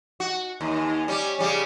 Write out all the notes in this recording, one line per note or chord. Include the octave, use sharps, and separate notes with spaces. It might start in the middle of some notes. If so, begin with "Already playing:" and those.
F#4
D#2
G3 C#4
C#3 G3 C#4